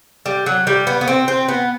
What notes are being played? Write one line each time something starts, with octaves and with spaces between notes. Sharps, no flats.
G3
F#3
G3
B3
B3
C4
C4
B3